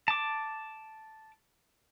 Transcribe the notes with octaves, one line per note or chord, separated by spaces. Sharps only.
A5 D6